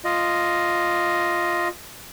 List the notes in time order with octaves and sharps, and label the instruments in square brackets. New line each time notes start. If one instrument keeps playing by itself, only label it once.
[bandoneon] F4 D#5